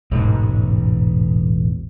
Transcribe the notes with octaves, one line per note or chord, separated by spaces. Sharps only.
E1 A1 G#2